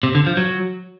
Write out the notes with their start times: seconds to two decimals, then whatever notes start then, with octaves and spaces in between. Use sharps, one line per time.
0.03 C3
0.15 D3
0.26 F3
0.37 F#3